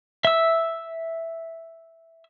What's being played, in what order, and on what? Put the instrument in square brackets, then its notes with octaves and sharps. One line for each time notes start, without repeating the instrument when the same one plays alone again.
[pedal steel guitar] E5 E6